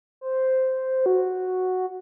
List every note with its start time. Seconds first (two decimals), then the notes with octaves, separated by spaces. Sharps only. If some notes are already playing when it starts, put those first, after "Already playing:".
0.21 C5
1.06 F#4